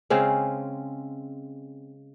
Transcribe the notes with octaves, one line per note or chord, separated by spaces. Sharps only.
C#3 G#3 C4 C#4